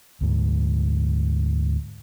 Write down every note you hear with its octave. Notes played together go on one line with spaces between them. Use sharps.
D2 G#2